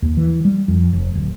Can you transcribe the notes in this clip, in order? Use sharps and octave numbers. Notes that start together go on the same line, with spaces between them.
D#2
E3
G3
F2
F1
D1